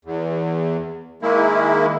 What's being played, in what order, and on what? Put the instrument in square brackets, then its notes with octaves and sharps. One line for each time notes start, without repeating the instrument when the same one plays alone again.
[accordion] E2
D#3 G#3 A#3 E4